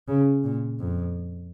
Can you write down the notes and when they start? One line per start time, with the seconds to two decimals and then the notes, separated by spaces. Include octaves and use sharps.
0.08 C#3
0.44 A#2
0.79 F2